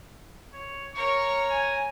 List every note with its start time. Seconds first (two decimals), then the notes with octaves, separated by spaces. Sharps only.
0.54 C#5
0.95 A#4 C#5 C#6
1.51 G#5